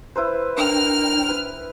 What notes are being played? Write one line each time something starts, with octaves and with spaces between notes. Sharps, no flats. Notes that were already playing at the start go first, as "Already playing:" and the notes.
E4 B4 C5
D4 A#4 G5 F6
B4